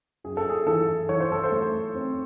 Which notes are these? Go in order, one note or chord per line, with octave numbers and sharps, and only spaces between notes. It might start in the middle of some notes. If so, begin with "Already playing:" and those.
F#2 G#4
A4
G#4
E3 A4
E3 C#5
C5
A4
C5
A3
C4